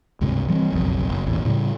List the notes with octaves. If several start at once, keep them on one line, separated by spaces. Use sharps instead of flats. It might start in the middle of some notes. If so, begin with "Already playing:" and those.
C#2 G2 C3
E3 G3 C4
F#1 B1 F2
F#1
A1 E2 A#2
A2 C#3 E3 G3